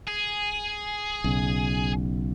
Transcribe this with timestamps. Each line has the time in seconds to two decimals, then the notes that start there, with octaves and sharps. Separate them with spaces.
0.08 G#4
1.24 B1 C#3